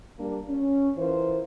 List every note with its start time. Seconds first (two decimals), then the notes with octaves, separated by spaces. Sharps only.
0.19 G3 A#3 D4
0.49 C#4
0.97 E3 F4 A#4 C5